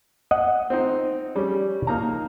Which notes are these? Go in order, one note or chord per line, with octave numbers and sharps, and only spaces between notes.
D#5 F#5
C4 D#4
G3 C#4
A#3 D#4 A#5